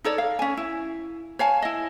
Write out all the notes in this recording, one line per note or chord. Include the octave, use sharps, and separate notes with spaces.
D#4 A4 C#5 D5
F5
C#4 G#5
E4
C#5 F5 G#5 A5
E4 D#5